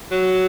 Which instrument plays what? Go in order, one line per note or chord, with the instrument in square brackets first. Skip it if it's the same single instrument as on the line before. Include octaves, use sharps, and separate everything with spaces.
[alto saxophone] F#3